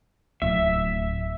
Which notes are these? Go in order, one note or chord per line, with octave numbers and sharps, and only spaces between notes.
D1 E5